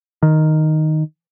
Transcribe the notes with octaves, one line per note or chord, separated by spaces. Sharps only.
D#3